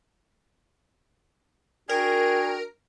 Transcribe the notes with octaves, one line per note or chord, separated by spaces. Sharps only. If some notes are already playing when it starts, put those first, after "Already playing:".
D4 F#4 G#4 A#4 G5